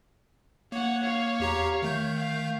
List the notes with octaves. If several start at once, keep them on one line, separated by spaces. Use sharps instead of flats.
A#3 C#5 F#5
C#5 F5
E2 G4 A#5
D#3 A3 G6
F5